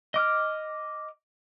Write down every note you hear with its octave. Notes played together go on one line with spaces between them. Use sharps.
D#5 D6 F6